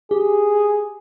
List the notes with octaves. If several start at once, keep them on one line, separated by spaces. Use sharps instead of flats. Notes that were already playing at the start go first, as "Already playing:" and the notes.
G4 G#4